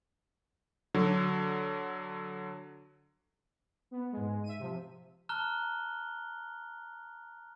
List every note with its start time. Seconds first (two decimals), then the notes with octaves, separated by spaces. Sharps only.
0.94 D3 F#3
3.91 B3
4.12 G#2 G#3
4.44 E5 D#7
4.59 C3 F3
5.29 A5 A#5 F6 F#6 G7